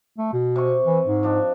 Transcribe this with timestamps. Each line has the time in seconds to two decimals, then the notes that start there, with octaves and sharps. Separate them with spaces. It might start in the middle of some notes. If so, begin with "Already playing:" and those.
0.18 A3
0.33 B2
0.56 C3 C#6
0.86 E3
1.06 G#2
1.23 F3 D4 D#5